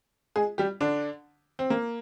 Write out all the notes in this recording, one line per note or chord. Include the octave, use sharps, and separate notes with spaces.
G#3 G#4
G3 G4
D3 D4
C4
A#3